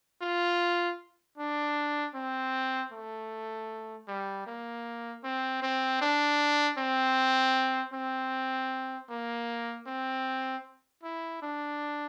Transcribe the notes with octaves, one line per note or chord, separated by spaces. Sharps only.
F4
D4
C4
A3
G3
A#3
C4
C4
D4
C4
C4
A#3
C4
E4
D4